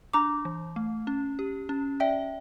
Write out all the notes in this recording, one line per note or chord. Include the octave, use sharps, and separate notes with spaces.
D4 A#5 D6
E3
A3
C#4
G4
C#4
D5 E5 G5